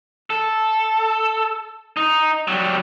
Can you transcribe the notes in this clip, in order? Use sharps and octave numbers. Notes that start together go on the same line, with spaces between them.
A4
D#4
F#3 G3